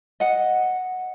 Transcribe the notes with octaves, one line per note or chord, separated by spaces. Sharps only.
D#5 F#5